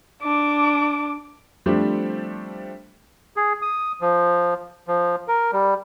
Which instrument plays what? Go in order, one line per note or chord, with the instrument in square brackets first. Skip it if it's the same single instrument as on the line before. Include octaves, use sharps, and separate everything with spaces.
[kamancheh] D4 D6
[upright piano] F3 G3 A3 C4 D4 G4
[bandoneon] G#4
D#6
F3
F3
A#4
G3